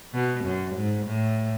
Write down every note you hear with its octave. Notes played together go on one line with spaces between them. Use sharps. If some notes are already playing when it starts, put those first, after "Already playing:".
B2
F#2
G#2
A2